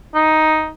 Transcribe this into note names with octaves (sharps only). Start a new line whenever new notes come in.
D#4